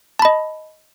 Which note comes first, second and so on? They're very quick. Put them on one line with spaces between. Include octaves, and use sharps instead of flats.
A5 B5 D#5